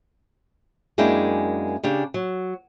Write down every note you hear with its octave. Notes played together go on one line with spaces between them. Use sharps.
F#2 G#3 A#3 D4 E4 G5
C#3 D4 G4
F#3